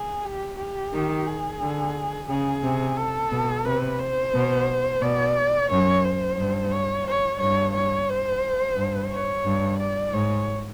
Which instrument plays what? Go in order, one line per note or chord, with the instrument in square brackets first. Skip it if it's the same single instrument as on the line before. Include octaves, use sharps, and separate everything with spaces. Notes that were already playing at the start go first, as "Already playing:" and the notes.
Already playing: [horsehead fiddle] G#4
G4
G4
[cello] D#3
[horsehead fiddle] G#4
[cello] D3
[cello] C#3 [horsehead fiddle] G#4
[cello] C3
[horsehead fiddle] A4
[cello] B2
[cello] C3 [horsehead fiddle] B4
[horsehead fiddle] C5
[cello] B2
[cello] B2 [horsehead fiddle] D5
[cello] F#2 [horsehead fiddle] C#5
[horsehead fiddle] C5
[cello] G2
[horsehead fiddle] C#5
C#5
[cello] G2 [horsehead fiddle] C#5
[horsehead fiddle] C#5
C5
[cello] G2
[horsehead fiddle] C#5
[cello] G2
[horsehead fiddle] D5
[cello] G#2 [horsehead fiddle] C#5